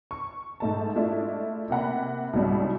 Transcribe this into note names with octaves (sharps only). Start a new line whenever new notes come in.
C#6
G#2 A3 A5
G#3 A3 D4 E4 F4
C3 A#3 F#5 B5
C2 G#2 C#3 F#3 G3